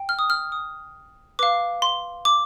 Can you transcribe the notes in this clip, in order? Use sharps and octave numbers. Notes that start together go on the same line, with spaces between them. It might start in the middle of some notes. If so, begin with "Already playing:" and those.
Already playing: G5
F6
D#6
F6
D#6
B4 F5 D6
C6
D6